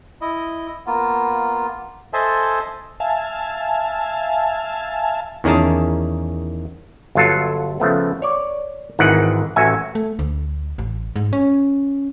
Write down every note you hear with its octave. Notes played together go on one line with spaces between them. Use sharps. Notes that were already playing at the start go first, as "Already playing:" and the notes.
E4 D#5
A#3 B3 F4
A4 C5 D#5 E5 G#5 A5
E5 F5 G#5 A5
E2 D#3 C#4 G#4 A#4 A5
G1 F#3 F4 A4 A5
C#3 F3 A3 B3
C#5 D5
G#1 G#2 D#3 E3 F#5
A1 F#4 E5 G#5
A3
D2
A1
G#2
C#4